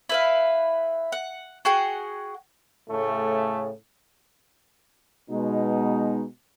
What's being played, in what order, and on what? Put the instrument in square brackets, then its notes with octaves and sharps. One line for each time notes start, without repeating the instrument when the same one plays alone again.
[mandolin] E4 B4 F5
F#5
F#4 G#4 F#5 G5
[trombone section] A2 C#3 A3
[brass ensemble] B2 [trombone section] G#3 D#4